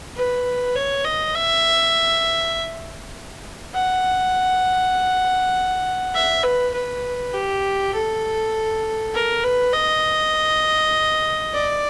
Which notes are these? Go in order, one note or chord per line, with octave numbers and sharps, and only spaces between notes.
B4
C#5
D#5
E5
F#5
E5
B4
B4
G4
A4
A#4
B4
D#5
D5